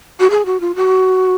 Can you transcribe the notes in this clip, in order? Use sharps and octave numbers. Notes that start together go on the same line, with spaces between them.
F#4
G#4
F#4
F4
F#4